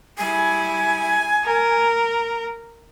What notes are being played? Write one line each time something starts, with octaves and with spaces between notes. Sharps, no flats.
G3 E4 G#5
A#4